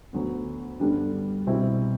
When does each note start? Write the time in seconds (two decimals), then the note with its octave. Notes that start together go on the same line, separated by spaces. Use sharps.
0.13 D2 D3 F#3 B3
0.80 G2 D3 G3 B3 D4
1.47 C2 B2 G3 C4 E4